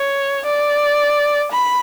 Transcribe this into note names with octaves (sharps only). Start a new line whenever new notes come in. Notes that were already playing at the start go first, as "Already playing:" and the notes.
Already playing: C#5
D5
B5